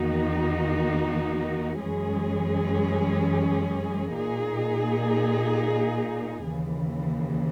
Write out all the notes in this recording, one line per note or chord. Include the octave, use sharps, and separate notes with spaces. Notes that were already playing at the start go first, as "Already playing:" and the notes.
Already playing: E2 D#3 A#3 D#4 F#4
F#2 E3 G#3 C#4 G#4
A#2 A#3 D#4 G#4
D#2 C#3 E3